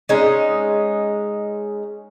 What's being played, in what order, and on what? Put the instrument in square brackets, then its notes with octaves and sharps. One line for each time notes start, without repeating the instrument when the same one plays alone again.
[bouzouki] G#3 C#4 D#4